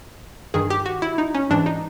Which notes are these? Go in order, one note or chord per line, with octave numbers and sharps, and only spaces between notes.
G2 D#3 G#4
G4
F#4
E4
D#4
C#4
G#2 E3 D4
D#4